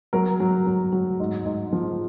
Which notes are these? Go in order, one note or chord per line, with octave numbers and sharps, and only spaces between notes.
F#3 A#4
F#3
F#3
F#3
G#2
G#2
F3